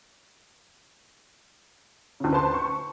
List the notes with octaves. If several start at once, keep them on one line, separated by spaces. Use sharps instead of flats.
D2 C#3
B4 C5 A5 C6
C#6